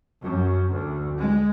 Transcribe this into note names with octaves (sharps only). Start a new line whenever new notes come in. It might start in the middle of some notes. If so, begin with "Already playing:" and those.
F#2
D2
G#3